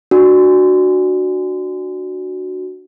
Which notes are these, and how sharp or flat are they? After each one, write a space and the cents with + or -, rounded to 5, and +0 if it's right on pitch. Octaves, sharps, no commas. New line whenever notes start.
D4 +15 F#4 +0